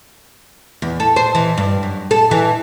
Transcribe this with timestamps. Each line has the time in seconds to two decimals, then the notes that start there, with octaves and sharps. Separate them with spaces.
0.82 E2
1.00 A4
1.16 C5
1.35 E3
1.58 G2
1.83 F#2
2.11 A4
2.31 E3